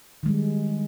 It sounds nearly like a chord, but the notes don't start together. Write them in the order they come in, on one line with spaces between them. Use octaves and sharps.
D#3 G#3 G3